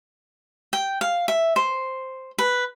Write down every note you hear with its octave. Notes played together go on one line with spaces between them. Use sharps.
G5
F5
E5
C5
B4